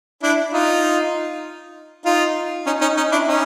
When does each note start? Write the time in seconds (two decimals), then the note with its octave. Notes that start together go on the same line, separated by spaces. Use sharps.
0.23 D4 E4
0.53 D#4 F4
2.05 D#4 F4
2.67 C#4 D#4
2.81 C#4 D#4
2.97 C#4 D#4
3.12 D4 E4
3.27 C#4 D#4